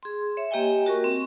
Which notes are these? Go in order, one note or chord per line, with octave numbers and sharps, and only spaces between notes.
G#4 C6
C#5 E5
A#3 G4 D#5 G5 G#5
F#4 A#4 C#6
C4